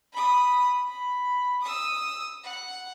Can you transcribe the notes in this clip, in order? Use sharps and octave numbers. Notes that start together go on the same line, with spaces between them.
B5 D#6
B5
D#6 E6
F#5